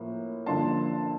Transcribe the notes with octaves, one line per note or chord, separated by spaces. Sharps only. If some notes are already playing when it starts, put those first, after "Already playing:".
Already playing: A2 F3 A#3
G2 D3 F3 A#3 A5 C6